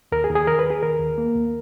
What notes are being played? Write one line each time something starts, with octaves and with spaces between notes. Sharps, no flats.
D#2 A#4
G#4
D#2
G#4
D#3 A#4
B4
D#2
G#4
D#3 A#4
D#2
A#3
D#2